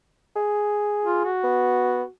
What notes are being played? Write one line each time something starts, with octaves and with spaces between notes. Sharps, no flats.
G#4
F4
F#4
B3